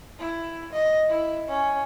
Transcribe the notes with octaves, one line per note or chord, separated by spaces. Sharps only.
E4
D#5
E4
C#4